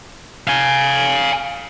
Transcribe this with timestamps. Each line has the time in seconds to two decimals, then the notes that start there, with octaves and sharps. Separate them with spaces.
0.47 F5 G#5